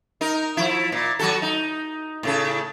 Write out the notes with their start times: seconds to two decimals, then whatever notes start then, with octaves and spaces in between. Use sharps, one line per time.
0.21 D#4 A#4
0.57 F3 E4
0.92 A#2
1.19 F#3 F#4 A4
1.42 D#4
2.23 A2 C#3 A4